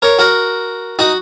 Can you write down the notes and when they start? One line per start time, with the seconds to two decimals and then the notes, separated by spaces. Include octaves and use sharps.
0.02 A#4 C#5
0.19 F#4 A#4
0.99 D#4 F#4